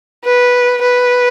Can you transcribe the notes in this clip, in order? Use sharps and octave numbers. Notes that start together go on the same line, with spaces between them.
B4
B4